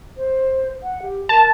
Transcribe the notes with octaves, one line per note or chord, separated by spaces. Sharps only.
C5
F#5
G4
A#4 A5